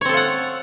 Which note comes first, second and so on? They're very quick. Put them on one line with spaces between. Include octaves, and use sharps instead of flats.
C#5 C4 A4 F4 F#5